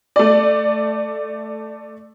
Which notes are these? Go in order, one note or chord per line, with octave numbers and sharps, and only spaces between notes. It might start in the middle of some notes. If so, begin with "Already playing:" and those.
A3 D5